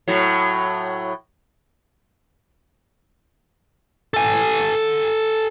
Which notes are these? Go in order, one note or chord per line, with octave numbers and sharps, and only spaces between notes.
A2 F#3
A4 G#5